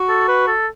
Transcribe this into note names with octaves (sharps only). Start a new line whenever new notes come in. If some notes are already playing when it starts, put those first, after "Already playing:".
Already playing: F#4
A4
B4
A4